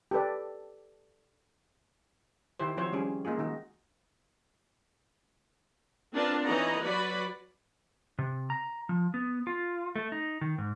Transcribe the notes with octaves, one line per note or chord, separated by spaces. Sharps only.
G4 A4 B4 D5
D#3 E4 G4 C5
F3 C4 E4 F#4 C5 C#5
G3 C#4 G#4
G#3 A#3 D#4 F4 G#4
D#3 D#4 F#4
C4 D4 F4 A#4 B4 A5
E3 D#4 C#5 D#5 F#5 A#5
F#3 F#4 B4 D5 B5
C3
A#5
F3
B3
F4
A3
D#4
D#3
G#2